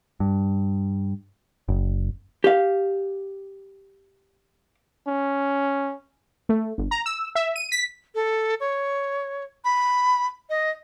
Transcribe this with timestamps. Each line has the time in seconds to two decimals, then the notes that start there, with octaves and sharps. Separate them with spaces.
0.20 G2
1.69 F#1
2.44 G4 F5
5.07 C#4
6.49 A3
6.78 G1
6.91 A#5
7.06 E6
7.35 E5
7.56 D#7
7.72 B6
8.15 A4
8.60 C#5
9.65 B5
10.50 D#5